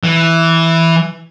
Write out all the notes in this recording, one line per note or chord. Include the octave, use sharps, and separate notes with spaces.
E3